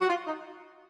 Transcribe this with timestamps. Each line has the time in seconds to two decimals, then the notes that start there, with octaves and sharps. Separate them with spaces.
0.02 F#4
0.09 F4
0.27 D#4